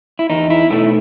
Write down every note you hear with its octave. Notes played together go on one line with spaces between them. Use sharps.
E4
E2 D#4
E4
B2 A3 D#4 E4